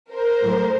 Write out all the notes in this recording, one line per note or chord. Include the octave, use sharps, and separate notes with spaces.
A#4 C5
A2 F#3 A3